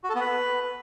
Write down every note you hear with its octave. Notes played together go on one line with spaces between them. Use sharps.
F#4
A4
B3
B4